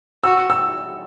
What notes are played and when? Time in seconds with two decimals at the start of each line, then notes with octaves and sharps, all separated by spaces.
0.24 F#4 E6
0.50 E6